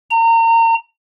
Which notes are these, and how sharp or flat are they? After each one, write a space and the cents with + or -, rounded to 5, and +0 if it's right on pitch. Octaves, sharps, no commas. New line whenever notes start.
A#5 -30